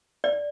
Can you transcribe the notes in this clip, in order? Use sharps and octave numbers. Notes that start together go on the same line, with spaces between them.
D5